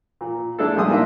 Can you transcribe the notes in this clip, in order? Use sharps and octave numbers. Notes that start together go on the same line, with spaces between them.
A#2
A3 D4 E4 G#4 A4
A#1 E3 G3 G#3 C6 D#6
A#3 D4 D#4 A#4 E5